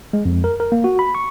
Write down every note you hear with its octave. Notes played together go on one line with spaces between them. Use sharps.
G#3
F2
A#4
A#4
A#3
F#4
B5
C#6